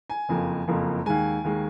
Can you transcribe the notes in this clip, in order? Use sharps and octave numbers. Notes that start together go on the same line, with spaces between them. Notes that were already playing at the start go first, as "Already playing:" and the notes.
G#5
F#1 F2 F3 A#3
F#1 F2 F3 A#3
D#2 D#3 G#3 G#5
D#2 D#3 G#3